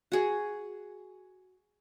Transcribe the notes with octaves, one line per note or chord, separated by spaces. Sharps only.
F#4 G#4